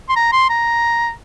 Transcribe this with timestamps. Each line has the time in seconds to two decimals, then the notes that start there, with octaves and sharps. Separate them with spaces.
0.09 C6
0.16 A#5
0.32 C6
0.49 A#5